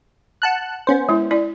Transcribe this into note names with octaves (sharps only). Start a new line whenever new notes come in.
F#5 A5 F#6
B3 C#4 C5
G#3 E4
E4 D5